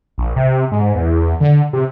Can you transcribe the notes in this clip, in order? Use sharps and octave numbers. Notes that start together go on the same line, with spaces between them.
A#1
C3
G#2
E2
D3
C3